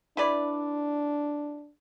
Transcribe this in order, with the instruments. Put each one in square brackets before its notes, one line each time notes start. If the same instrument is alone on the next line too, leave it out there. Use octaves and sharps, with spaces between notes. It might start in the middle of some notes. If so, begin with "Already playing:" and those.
[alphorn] D4 [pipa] E4 B4 D5